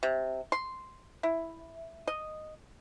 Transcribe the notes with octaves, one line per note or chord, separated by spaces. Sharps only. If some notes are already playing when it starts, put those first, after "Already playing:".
C3
C6
E4
D#5